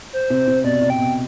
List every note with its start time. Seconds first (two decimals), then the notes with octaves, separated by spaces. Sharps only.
0.13 C5
0.30 C3
0.47 C3
0.64 B2 D5
0.82 C3
0.90 G5
0.98 B2